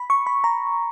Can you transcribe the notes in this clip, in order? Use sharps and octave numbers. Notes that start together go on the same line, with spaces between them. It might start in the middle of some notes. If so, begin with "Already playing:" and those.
Already playing: B5
C#6
B5
A#5